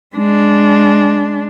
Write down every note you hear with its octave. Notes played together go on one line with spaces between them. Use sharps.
G#3 D4